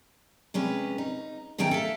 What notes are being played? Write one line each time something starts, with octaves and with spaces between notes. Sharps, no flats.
C3 G#3 C#4 B4
D#4
B2 D#3 A3 C#4 G5 A#5
A4 E5 F5